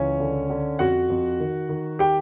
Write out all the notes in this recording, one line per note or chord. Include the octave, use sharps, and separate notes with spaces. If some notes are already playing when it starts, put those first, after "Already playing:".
Already playing: C#2 E3 C#4 C#5
D3
D3
F2 F#4 F#5
F2
D#3
D#3
G4 G5